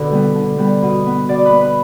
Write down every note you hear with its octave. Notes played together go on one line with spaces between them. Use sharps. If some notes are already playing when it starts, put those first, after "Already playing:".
Already playing: B2 D3 A4 B4
G3 B3
D3
G3 B3
B2
B3
B2 D5 D6
B4 B5
B3
B4 B5